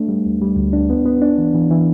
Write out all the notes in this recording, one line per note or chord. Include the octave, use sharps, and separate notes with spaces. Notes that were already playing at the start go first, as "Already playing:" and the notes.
Already playing: A3 D4
G3
D2
G3
D2
D4
B3
B3
D4
E3
E3
E3